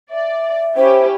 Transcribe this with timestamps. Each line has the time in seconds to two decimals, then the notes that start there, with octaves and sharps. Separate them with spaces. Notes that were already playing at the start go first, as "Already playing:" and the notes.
0.11 D5 E5
0.77 C#4 E4 G4 C5